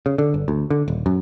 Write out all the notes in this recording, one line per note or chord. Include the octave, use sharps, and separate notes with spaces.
C#3
D3
G1
D2
D3
D#1
F#2